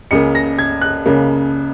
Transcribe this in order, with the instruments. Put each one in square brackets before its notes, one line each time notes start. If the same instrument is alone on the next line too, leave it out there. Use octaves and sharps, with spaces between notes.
[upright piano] C#2 C#3 A#3 C#7
A#6
G#6
F#6
C#2 C#3 A#3